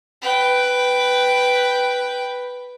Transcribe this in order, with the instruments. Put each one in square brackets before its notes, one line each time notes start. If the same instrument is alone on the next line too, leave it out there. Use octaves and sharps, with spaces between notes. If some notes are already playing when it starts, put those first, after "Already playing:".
[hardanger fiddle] B4 G5